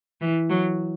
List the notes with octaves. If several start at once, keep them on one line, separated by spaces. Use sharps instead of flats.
E3
F#3